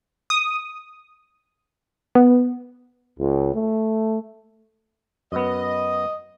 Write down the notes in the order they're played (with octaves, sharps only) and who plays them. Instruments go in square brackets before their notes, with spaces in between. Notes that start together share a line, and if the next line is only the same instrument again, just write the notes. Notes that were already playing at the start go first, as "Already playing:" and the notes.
[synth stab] D#6
B3
[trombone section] C#2
A3
[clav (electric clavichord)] F#2 B3 [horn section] D#5